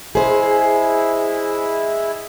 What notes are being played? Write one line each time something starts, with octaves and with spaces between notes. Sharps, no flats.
G#3 E4 G#4 C5